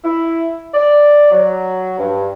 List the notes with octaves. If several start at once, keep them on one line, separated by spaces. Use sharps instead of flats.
E4
D5
F#3
G2